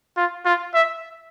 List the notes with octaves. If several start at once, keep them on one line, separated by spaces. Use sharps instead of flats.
F4
F4
E5